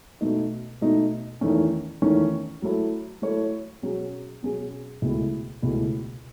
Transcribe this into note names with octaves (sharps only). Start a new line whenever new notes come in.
B2 A3 D#4
B2 A3 D#4
E2 D#3 A3 C#4
E2 D#3 A3 C#4
F#3 A3 E4 A4 C#5
F#3 A3 E4 A4 C#5
B2 F#3 C#4 G#4
B2 F#3 C#4 G#4
C#2 B2 A3 E4
C#2 B2 A3 E4